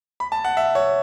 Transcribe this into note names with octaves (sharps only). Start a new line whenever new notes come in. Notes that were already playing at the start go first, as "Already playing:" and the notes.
B5
A5
F#5
E5
C#5